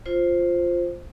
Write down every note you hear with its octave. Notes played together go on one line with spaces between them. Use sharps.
F4 C5